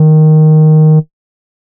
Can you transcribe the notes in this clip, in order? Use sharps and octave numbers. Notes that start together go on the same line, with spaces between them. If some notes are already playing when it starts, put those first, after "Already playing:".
Already playing: D#3